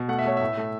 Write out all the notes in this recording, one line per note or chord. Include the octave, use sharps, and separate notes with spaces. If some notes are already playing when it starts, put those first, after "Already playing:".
Already playing: B2
A3 F#5
E5
A3 C#5
A2 E5
A3